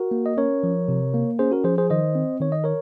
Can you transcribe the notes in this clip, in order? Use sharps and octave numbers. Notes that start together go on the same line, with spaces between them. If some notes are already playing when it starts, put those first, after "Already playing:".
Already playing: F#4 A#4
A#3
D#5
C#4 A#4 C#5
F3
C3
A#3
C#4 G#4 C5
F#4 A#4
F3 G#4 C5
G#4 C5
D#3 C5 D#5
C4
D#3 C#5
D#5
A#4 C#5